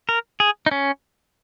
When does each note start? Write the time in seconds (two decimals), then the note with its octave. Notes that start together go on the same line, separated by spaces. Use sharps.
0.09 A#4
0.40 G#4
0.66 D#4
0.71 C#4